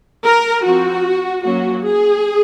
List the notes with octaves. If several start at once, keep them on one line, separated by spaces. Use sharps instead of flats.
A#4
F3 C4 F#4
F#3 A#3 C#4 F#4
G#4